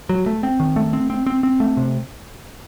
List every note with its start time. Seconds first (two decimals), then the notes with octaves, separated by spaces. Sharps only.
0.09 F#3
0.26 A3
0.43 C4
0.60 D#3
0.76 A3
0.93 C4
1.10 C4
1.26 C4
1.43 C4
1.60 A3
1.77 C3